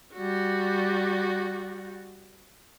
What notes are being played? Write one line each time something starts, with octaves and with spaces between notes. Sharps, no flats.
G3 F#4